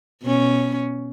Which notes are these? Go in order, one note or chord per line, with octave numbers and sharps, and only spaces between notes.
B2 C#4